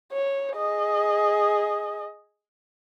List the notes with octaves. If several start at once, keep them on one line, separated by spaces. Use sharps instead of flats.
C#5
G#4 D#5